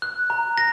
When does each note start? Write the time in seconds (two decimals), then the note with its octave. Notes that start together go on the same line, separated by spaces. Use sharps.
0.02 F#6
0.30 A#5
0.58 A#6